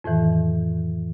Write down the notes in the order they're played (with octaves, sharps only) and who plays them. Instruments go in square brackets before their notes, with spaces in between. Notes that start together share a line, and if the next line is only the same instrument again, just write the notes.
[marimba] F2 A2 D#3 E3